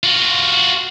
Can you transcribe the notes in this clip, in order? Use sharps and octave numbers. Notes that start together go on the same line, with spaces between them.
F4 F#4